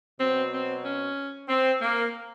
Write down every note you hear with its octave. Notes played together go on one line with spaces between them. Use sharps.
B2 F#3 C4
C4
C#4
C4
A#3